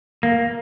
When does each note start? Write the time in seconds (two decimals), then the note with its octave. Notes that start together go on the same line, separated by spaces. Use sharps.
0.23 A#3